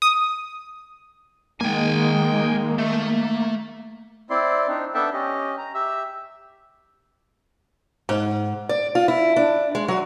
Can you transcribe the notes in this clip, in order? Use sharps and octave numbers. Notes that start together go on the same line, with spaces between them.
D#6
D#3 G#3 A#3 G5 G#5
A3
C4 E4 D5 C6
C4 D4 D#4
B3 D4 A4 E5 G5 A5
C#4 G4 D#5
A#5
G4 E5 E6
G#2
D5
F4
E4
D4
G#3
F#3